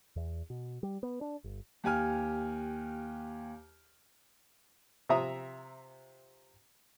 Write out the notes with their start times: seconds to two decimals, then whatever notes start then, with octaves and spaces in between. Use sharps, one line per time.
0.16 E2
0.50 B2
0.83 G3
1.03 B3
1.21 D4
1.44 G1
1.84 D#2 G4 G#5 F6
5.09 C3 F3 E5 A#5 D#6